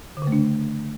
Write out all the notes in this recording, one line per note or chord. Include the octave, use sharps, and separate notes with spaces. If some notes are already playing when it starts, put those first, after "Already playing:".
D3
C#3
A3
D4